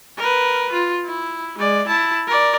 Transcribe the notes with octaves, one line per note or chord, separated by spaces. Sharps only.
A#4 B4
F4
E4
G#3 D5
E4 A5
A#4 D5